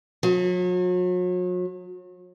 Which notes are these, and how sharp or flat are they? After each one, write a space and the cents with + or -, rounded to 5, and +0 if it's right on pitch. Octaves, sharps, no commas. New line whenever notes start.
F#3 -40